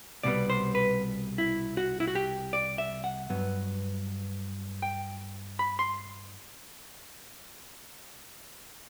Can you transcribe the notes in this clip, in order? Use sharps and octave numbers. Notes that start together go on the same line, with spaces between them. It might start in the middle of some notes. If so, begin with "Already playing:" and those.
C2 B2 G3 B3 D5
C5
B4
E4
F#4
E4
F#4
G4
D5
E5
F#5
G2 F#3 B3
G5
B5
C6